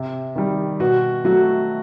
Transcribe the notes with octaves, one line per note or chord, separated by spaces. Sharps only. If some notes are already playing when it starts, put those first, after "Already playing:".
Already playing: C3
D#3 G3
B2 F#4
F#3 A3 F#4